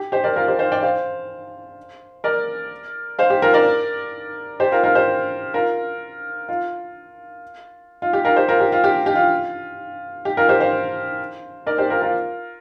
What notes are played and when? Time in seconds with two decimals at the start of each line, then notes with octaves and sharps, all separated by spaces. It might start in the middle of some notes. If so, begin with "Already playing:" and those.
Already playing: G4
0.12 G4 C5
0.24 A#4 D5
0.36 F4 A#4
0.48 G4 C5
0.59 C5 F5
0.72 D5 G5
0.83 C5 F5
2.24 A#4 D5
3.19 C5 F5
3.30 G4
3.42 F4 A#4
3.54 A#4 D5
4.60 G4 C5
4.72 F4 A#4
4.84 F4 A#4
4.95 G4 C5
5.54 F4 A#4
6.49 F4
8.02 F4
8.13 G4
8.25 F4 A#4
8.36 G4 C5
8.48 F4 A#4
8.60 G4
8.72 F4
8.84 G4
9.06 G4
9.15 F4
10.25 G4
10.37 F4 A#4
10.49 G4 C5
10.60 C5 F5
11.66 A#4 D5
11.78 G4 C5
11.90 F4 A#4
12.02 F4 A#4